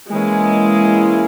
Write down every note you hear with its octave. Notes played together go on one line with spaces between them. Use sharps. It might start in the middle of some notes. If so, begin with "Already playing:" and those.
E3 G#3 A#3 C#4 E4 G#4